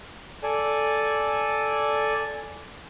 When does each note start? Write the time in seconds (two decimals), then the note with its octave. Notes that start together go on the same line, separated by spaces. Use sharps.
0.43 A4 D5 G#5